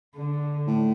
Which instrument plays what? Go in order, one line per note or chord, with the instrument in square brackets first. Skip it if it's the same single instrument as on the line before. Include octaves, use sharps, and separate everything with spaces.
[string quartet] D3
[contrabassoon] A2